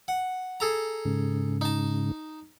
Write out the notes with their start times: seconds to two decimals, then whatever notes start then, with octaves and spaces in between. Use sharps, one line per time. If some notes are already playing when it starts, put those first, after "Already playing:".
0.08 F#5
0.60 G#4 A4 A#5
1.05 G#2 C#3
1.61 D#4 A5